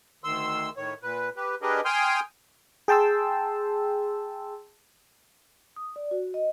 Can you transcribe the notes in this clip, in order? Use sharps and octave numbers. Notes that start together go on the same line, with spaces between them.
D2 D#3 C6 E6
A2 D#3 C#5
A#2 B4
G4 B4
D4 G4 G#4 A#4 B4 D#5
G5 G#5 C6 D#6 F6 G6
G#4 G5 A5 C6 E6
D#6
D5
F#4
D#5